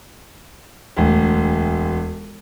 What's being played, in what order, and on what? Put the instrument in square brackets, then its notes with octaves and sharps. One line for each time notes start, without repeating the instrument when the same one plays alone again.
[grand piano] E1 D2